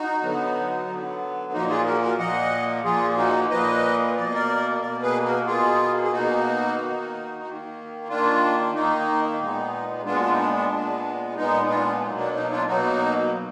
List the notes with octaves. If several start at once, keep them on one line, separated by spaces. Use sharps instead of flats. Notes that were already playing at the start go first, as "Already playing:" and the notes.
Already playing: D#4 F#4
D3 F#3 B3
D3 F#3 B3
A#2 F3 A#3 D#4 F#4
F4 G#4
F#4 A#4
F#4 A#4
A#2 F3 A#3 D#5 F#5
A#2 F3 A#3 F4 G#4
D#4 F#4
A#2 F3 A#3 B4 D#5
B2 A#3 D5 D#5
A#4 D5
B2 A#3 A#4 D5
G#4 B4
F#4 A#4
B2 A#3 F4 G#4
G#4
B2 A#3 D#4 F#4
D#3 A#3
D#3 A#3
D#3 A#3 D4 F4
D#3 A#3 D#4
A#2 G#3 B3 D#4
A#2 G#3 B3 D4 F4
F#4
D4 F4
D#4
D4
D4
A#2 G#3 B3
A#2 G#3 B3 D#4
D4 F4
B2 F#3 A#3 D#4
D4
D#4
D4 F4
B2 F#3 A#3 D#4 F#4